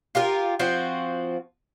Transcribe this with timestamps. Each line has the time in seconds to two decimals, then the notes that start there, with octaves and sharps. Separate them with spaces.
0.15 F4 G4 A#4
0.60 F3 C4 F#4